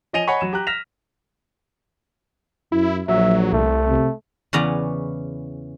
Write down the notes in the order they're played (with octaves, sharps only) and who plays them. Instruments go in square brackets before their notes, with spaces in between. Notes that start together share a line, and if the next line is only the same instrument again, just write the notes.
[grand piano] F3 C#5 D#5 G#5 D#7 F7
C#5 D#5 F#5 G#5 B5 C#6
F#3 E7
G4 A#5 F#6
F6 A#6 B6 E7 F7
[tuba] F#2 [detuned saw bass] E4
[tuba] A#1 [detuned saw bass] F#3 [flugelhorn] E5
[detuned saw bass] C2 [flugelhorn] A3
[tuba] C3
[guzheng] E2 C#3 B3 C#4 D5 A#5